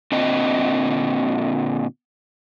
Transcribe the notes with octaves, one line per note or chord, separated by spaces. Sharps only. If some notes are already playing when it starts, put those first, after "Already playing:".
A#2 D3 C4 D#5